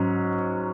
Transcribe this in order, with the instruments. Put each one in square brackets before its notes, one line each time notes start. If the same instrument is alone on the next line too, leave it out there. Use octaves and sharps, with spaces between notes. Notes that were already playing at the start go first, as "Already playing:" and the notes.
Already playing: [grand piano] G#2 F#3 C#4